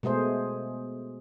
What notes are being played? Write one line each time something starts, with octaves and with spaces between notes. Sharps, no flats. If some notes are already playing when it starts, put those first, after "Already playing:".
B2 G#3 A3 G#4 C5